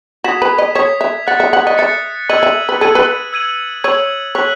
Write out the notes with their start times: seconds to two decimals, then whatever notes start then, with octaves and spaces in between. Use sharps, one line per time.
0.24 F#4 D#6 G#6 B6 E7
0.42 B4
0.58 D#5
0.75 C#5 D#6 G#6 B6 E7
1.01 E5
1.27 F#5 F#6 A6 C#7
1.40 E5
1.53 F#5
1.67 D#5
1.78 E5 F#6 A6 C#7
2.29 D#5 E6 G#6 D#7 F#7
2.43 E5
2.69 B4
2.81 A4 E6 G#6 D#7 F#7
2.95 B4
3.33 E6 G#6 D#7 F#7
3.84 C#5 E6 G#6 D#7 F#7
4.35 C#5 F#6 B6 F#7